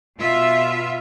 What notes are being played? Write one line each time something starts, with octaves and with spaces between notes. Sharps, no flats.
B2 F4 E5